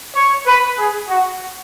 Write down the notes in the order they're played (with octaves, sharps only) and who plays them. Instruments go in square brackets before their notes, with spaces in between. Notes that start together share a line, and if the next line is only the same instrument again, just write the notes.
[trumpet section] C#5
B4
G#4
F#4